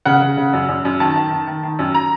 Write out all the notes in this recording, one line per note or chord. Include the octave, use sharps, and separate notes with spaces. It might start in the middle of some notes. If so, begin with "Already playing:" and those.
C#3 F#5
C#3
C#3
F#2
F#2
F#2
D#3 A5
D#3
D#3
D#3
D#3
F#2
A#5